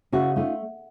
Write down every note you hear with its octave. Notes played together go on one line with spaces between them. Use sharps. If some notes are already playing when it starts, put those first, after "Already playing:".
C#3 E4 F#4
A3 D#4 F4